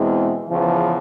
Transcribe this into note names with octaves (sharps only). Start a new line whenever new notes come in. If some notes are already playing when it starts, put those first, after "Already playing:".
Already playing: E2 B2 G#3 C4 E4
E2 C#3 F3